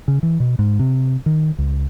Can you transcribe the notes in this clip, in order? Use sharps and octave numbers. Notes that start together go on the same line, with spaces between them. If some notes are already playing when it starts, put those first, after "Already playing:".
C#3
E3
B2
G#2
C3
D#3
C#2